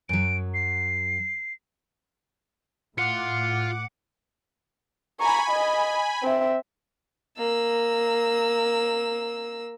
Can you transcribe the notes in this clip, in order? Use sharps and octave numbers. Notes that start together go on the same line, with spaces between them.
F#2 F#3 D7
C7
A2 F4 F#5 D6 C#7
G#5 A#5 B5 C#6
D#5
C4 E5
A#3 E6